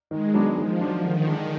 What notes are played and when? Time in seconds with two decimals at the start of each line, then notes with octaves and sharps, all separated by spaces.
0.10 D#3 G#3
0.34 F#3 B3 D4
0.57 D#3 F3
0.81 F#3 D4
1.03 D3 D#3
1.27 G#3 D4